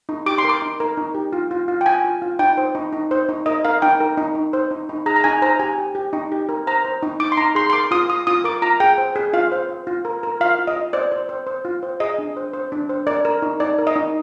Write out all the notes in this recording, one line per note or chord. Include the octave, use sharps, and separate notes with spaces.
D#4
G4 D6
C6
A#4 D6
D#4
A#4
D#4
G4
F4
F4
F4
G5
F4 G#5
F4
F4
D#4 G5
C5
D#4
D#4
C5
D#4
A#4 D#5
A#4 F5
D#4 G5
A#4
D#4
D#4
C5
D#4
D#4
G#4 A#5
A#5
D#4 G#5
C5 A#5
G4 G#5
G4
G4
D#4
G4
A#4
C5 A#5
C5
D#4
D#4 D6
C6
D#4 A#5
G#4 C6
C6
A#4 D6
F4 D#6
F4 D#6
F4 D#6
A#4 D6
F4 A#5
G#4 G5
C5
G#4
F4 F5
C5
C5
F4
A#4
A#4
F4 F5
F4
D#5
F4
C5 D5
C5
C5
C5
F4
C5
G#4 D#5
D4
C5
C5
D4
C5
A#4 D5
A#4
D#4
D#4 D5
A#4
D#5
D#4